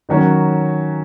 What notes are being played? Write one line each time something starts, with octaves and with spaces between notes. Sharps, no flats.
D#3 F#3 C#4 F#4 A#4